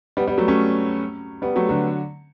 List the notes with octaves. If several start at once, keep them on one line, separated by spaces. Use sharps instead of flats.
G3 B3
G3 B3
F#3 A3
A3 C#4
G3 B3
F#3 A3
D3 F#3